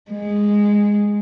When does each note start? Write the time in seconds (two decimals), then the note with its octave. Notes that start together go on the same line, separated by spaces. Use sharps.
0.11 G#3